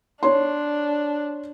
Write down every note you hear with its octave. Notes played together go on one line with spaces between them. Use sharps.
D4 C#5 C6